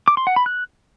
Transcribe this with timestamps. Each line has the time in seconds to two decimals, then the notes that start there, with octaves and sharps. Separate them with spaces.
0.08 D6
0.17 C6
0.27 F#5
0.36 B5
0.46 F#6